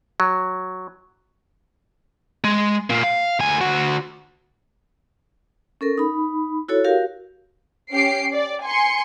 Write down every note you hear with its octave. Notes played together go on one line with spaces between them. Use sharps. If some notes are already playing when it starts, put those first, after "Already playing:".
F#3
G#3
A#2 A#3
F5
D2 G#5
D3 F#4
C#4 A4 A#4
D#4 B5
E4 F#4 A4 C#5
F#4 G4 A#4 F5
C#4 G4 C7 D7
D5
G#5 C6 C#7